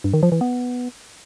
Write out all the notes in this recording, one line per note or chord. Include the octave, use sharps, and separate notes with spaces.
G2
D#3
F3
E3
B3